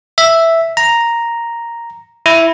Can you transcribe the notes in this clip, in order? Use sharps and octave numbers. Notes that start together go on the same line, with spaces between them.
E5
A#5
E4